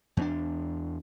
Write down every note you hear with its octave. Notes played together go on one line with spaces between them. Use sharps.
E2 A#3 D4